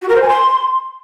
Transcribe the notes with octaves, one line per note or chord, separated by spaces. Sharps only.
F#4
A#4
C5
G#5
C6